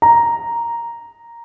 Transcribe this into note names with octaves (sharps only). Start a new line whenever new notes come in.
A#5